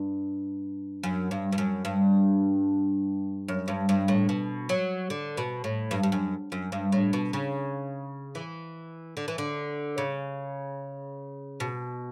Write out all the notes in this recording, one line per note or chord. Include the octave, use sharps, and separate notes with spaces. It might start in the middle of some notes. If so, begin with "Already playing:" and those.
Already playing: G2
F#2
G2
G2
F#2
G2
F#2
G2
G2
A2
B2
F#3
D3
B2
A2
G2
G2
F#2
F#2
G2
A2
B2
C#3
E3
D3
E3
D3
C#3
B2